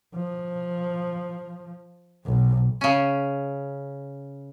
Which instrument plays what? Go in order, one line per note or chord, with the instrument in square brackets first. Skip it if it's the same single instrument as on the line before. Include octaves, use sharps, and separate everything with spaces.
[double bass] F3
B1
[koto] C#3 C#4